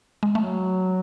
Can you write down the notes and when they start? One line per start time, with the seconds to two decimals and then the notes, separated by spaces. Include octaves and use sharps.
0.23 G#3
0.35 F#3 A3